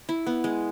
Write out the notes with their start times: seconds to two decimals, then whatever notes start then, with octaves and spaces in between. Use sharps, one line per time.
0.09 E4
0.27 B3
0.44 G#3